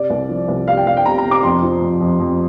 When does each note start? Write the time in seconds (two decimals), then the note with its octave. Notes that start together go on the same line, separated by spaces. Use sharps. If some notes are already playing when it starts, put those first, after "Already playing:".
Already playing: C3 D5
0.10 C2
0.29 F3
0.48 C2
0.68 C3 F5
0.77 G5
0.87 C2 F5
0.97 G5
1.06 C3 A#5
1.18 A#5
1.24 C3
1.31 D6
1.43 F2 C6
1.63 F3
1.82 F2
2.01 F2
2.20 F2